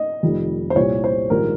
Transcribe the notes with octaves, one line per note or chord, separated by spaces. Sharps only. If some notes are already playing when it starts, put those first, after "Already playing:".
Already playing: D#5
F1 F2 D#3 G3
C5
C2 A#2 G3 C#5
C5
A#1 G#2 D#3 G3 A#4